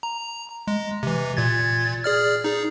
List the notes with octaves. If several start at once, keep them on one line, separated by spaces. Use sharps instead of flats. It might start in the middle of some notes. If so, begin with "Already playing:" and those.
A#5
G#3
C3 E3
A#2 G#6 A6
G#4 D5 F6
D#4 G#4